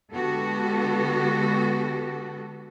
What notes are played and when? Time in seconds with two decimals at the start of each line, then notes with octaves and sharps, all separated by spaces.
0.11 D3 G#3 B3 F#4 G4 A4